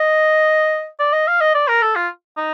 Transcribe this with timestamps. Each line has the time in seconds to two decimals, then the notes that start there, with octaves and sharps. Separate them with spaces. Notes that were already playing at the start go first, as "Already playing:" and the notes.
Already playing: D#5
1.00 D5
1.13 D#5
1.27 F5
1.40 D#5
1.55 D5
1.68 A#4
1.82 A4
1.96 F4
2.37 D#4